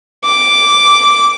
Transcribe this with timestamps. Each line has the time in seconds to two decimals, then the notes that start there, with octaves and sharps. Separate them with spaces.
0.25 D6